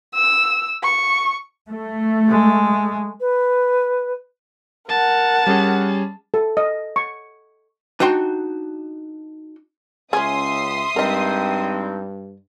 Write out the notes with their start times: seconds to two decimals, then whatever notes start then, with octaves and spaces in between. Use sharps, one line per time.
0.15 E6
0.83 C#6
1.68 A3
2.28 G#3
3.20 B4
4.89 A#4 F#5 A5
5.46 G3 C#4 G#4
6.34 A4
6.57 D#5
6.96 C#6
8.00 D4 D#4 F#4 G5 C6
10.13 C#2 C#4 G#4 E5 C6 D#6
10.96 G2 G#3 C4 D#4 A#4 D#5